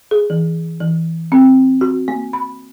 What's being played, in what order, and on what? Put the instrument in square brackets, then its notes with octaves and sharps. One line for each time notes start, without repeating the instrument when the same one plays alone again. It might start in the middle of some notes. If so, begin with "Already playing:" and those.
[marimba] G#4
E3
E3
C4
F#4
A#3
B5